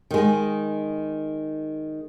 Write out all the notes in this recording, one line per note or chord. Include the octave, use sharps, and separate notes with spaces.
D#3 G#3